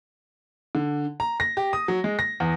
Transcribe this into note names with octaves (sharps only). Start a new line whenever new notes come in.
D3
A#5
A#6
G4
D#6
F#3
G#3
A#6
E2